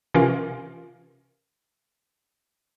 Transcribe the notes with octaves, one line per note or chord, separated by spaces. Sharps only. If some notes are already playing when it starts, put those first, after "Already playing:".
C3 E3 C#4 F4 A#4 F5